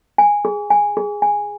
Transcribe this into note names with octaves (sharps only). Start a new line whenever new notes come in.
G#5
G#4
G#5
G#4
G#5